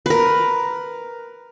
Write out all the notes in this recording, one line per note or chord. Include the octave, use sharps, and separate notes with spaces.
A#4 B4